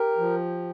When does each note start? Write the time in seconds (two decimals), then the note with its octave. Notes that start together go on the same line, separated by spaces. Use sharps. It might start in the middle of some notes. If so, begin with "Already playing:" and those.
Already playing: G4 A#4
0.18 F3